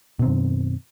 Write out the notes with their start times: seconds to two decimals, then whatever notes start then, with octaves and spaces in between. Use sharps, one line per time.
0.19 B2
0.22 C4
0.25 D#3
0.27 F#2